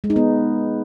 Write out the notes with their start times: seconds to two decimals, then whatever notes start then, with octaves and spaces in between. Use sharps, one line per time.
0.04 G#3
0.10 D#4
0.16 B3